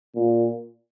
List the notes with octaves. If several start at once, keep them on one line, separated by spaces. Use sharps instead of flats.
A#2